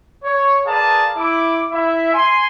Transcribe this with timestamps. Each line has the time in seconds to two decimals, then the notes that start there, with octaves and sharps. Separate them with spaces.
0.24 C#5
0.66 G#4 A#4 B4 D5 F5 A5
1.17 E4 D6
1.72 E4 E5
2.13 G#5 C6